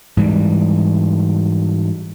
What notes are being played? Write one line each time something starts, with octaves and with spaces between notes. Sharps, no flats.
G#2 E3 G3